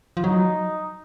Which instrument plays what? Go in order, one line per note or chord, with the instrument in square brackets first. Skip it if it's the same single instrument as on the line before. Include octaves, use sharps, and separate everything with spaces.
[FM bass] F3
[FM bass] F#3 [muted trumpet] D#4